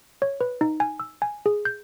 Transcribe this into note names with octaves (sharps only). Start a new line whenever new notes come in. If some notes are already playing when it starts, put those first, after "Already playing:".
C#5
B4
D#4
G#5
E6
G#5
G#4
G6